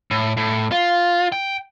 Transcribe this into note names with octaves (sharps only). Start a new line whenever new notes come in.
A2
A2
F4
G5